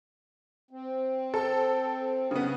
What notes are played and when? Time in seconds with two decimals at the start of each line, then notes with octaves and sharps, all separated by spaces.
0.71 C4
1.34 A4
2.31 C#3 B3